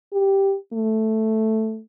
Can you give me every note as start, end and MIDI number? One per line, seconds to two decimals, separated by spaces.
0.13 0.55 67
0.73 1.80 57